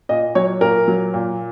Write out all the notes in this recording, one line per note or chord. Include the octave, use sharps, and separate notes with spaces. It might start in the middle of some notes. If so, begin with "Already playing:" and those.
A#2 D#5
F#3 C#5
A#2 A#4
F#3
A#2